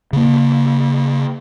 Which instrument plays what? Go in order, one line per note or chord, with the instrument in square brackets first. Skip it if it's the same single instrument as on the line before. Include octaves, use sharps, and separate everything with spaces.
[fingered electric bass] C#3 A#3